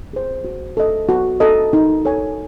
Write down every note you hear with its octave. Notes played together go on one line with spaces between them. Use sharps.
G#4 C5
F#4
A4 D#5
F#4
A4 D#5
D#4
A4 C#5 G#5